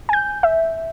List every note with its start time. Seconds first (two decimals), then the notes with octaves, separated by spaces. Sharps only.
0.09 G#5 G6
0.43 E5